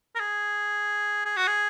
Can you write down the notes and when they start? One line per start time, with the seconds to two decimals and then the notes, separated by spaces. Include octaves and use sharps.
0.15 A#4
0.20 G#4
1.25 G#4
1.36 F#4
1.47 G#4